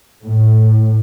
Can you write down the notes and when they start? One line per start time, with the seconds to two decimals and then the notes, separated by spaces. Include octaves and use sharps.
0.24 A2